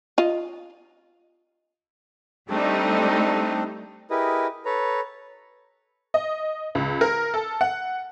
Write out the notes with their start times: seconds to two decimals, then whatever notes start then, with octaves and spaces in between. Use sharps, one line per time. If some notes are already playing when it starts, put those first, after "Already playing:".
0.18 F4 D#5
2.50 G3 A3 C4 D4 D#4
4.10 E4 G4 G#4 A#4 B4 D#5
4.65 A4 B4 C#5 A#5
6.14 D#5
6.75 C#2
7.01 A#4
7.34 A4
7.61 F#5